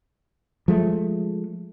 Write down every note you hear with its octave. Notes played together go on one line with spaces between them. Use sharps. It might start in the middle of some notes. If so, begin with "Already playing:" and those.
F3 G#3 A3